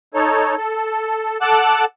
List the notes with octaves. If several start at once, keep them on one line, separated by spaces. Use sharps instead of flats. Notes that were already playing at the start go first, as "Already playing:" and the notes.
D#4 A4 C#5
A4
A4 F#5 A5 D6 F#6